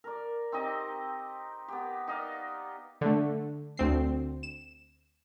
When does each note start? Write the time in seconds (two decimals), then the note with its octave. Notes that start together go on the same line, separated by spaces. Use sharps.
0.04 A#4 D5
0.52 C4 D#4 G4 D#5
1.68 B3 G4
2.08 D#4 D5 D#5 F5
3.01 D3 A3
3.77 D2 C4 C7
4.43 E7